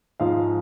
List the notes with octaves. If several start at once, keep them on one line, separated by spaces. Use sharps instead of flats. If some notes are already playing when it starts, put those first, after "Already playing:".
G#2 F3 G#3 F5